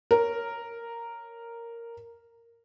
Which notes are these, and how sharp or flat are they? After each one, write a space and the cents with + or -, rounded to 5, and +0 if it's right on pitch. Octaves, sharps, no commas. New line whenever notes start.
A#4 -5 C#5 +0